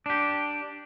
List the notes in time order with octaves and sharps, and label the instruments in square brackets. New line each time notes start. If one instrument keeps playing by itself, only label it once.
[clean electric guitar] D4 G4